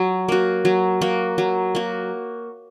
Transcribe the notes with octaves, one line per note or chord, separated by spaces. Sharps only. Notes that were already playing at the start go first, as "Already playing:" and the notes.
Already playing: F#3
A#3 F#4
F#3
A#3 F#4
F#3
A#3 F#4